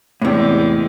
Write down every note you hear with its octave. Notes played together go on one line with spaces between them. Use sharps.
E2 A2 C3 G#3